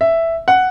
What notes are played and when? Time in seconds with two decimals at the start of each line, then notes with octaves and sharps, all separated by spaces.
0.01 E5
0.48 F#5